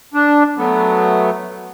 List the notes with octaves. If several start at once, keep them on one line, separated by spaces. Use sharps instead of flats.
D4
F#3 A3 B3